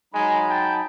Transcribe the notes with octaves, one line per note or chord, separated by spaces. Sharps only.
F#3 G#3 D#4 G#5 B5
G5 A5